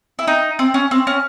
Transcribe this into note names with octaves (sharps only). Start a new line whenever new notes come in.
E4
D#4
C4
C#4
C4
C#4